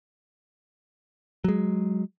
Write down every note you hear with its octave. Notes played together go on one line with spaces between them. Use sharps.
F#3 G#3